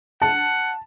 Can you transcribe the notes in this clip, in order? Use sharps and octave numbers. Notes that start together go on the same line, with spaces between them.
F#5 A5